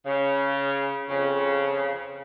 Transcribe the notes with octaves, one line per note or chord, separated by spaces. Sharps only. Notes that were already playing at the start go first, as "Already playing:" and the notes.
C#3
F2 C#3